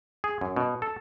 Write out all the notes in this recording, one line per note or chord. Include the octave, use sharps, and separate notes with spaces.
G#4
F#2
B2
A4